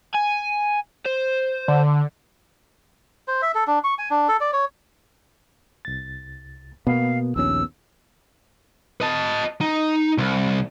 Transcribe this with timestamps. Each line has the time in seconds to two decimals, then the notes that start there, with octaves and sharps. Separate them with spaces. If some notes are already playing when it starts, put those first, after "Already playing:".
0.14 G#5
1.05 C5
1.68 D3
3.28 C5
3.42 E5
3.55 A4
3.67 D4
3.84 C#6
3.99 G#5
4.10 D4
4.29 A4
4.41 D5
4.53 C#5
5.85 C2 A6
6.87 B2 A#3 B3 F5
7.36 A#1 D#2 C#4 E6
9.01 D#5 A5
9.61 D#4
10.18 C2